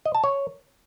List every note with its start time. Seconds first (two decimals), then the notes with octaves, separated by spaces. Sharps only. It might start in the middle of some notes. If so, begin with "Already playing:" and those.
0.05 D#5
0.15 A5
0.24 C#5